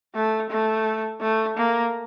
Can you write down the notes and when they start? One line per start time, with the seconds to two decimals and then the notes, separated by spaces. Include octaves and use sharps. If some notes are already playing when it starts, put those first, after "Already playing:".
0.15 A3
0.50 A3
1.21 A3
1.57 A#3